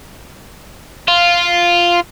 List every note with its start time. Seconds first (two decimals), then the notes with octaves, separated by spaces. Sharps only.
1.08 F4